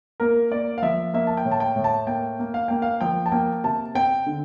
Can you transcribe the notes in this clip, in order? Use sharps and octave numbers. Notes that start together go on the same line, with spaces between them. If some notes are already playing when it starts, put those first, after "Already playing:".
A#3 A#4
A#3 D5
F5
F3 E5
A#3 E5
A5
G5
A2
A5
G5
A2
A5
A#3 G5
A#3
F5
A#3 G5
F5
F3 G5
A5
A#3 G5
C3 A5
C4 G5
D3